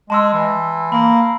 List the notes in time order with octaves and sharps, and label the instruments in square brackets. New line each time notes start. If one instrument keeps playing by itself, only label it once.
[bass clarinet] G#3 [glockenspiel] A5 C6 E6
[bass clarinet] E3
[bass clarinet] A#3 [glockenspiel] B5